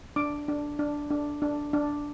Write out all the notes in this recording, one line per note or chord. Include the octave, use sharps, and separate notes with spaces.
D4 D6
D4
D4
D4
D4
D4